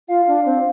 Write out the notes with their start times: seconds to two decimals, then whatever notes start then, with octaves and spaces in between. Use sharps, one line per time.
0.08 F4 F5
0.27 D4
0.46 C4